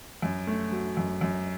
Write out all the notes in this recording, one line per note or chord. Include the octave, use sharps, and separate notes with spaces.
F#2
A3
F#3
F#2
F#2